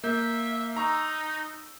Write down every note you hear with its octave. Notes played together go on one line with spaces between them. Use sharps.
A#3 E5 G6
D#4 A#5 C#6 E6